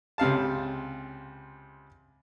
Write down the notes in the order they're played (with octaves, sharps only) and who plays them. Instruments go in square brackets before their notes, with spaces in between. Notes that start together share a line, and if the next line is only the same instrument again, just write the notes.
[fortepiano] C#2 C3 F5 A5